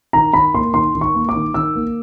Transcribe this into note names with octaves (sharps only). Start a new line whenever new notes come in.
D#3 A#5
D#3 B5
A#3 C6
D#3 C6
D#3
C#6
A#3
D6
D#3
D#3 E6
A#3